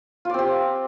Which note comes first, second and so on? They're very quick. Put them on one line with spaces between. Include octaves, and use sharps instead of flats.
F4 D5 C4 G4